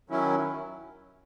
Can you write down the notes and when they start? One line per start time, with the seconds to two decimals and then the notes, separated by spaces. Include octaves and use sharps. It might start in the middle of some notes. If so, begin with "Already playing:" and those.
0.09 D#3 F#3 C#4 E4